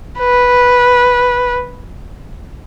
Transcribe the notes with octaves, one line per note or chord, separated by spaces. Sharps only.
B4